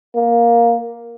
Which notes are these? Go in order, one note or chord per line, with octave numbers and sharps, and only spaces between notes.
A#3